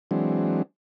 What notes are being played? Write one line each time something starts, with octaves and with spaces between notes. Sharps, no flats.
E3 F#3 G#3 C4 D4